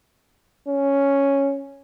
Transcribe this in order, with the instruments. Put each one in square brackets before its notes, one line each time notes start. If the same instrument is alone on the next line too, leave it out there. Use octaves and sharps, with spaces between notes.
[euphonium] C#4